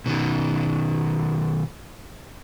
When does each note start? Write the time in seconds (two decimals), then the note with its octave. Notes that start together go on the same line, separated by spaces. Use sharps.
0.06 B2 D#3